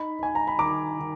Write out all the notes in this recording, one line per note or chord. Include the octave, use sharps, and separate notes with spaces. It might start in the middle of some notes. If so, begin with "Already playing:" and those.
Already playing: D#4 B5
D#4 G#5
A#5
B5
D#3 A#5 D6
D#3